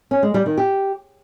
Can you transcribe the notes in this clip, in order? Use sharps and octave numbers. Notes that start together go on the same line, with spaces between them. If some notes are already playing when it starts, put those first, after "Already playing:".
C#4
G#3
G3
D#3
G4